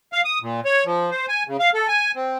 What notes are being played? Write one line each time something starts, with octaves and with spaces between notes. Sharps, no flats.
F5
D#6
A#2
C#5
F3
C5
G#5
C#3
F5
A4
G#5
C4